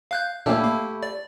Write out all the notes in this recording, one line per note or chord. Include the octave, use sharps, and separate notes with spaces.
F5 F#6 G6
A#2 A3 A#3 E4 G4
A#3
D5